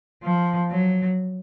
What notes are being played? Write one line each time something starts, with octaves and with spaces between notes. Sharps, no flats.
F3
F#3